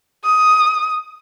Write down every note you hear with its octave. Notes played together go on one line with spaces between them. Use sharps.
D#6